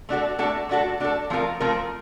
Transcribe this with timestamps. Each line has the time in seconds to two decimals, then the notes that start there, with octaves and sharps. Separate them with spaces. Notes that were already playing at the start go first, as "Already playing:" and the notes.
0.09 A3 D4 F#4 A4
0.39 A3 D4 F#4 A4
0.69 A3 D4 F#4 A4
1.00 A3 D4 F#4 A4
1.30 F3 A3 C4 F4 A#4
1.60 F3 A3 C4 F4 A#4